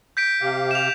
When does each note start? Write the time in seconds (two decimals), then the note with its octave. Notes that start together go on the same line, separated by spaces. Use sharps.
0.17 G6 B6 D7
0.41 C3 G4 F5
0.71 E7 F7